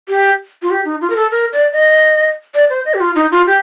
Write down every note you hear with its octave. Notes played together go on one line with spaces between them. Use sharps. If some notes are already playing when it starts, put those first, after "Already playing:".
G4
F4
G4
D#4
F4
A#4
A4
A#4
D5
D#5
D5
C5
D#5
G4
F4
D#4
F4
G4